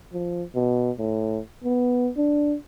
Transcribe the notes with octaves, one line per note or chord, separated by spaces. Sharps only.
F3
B2
A2
B3
D4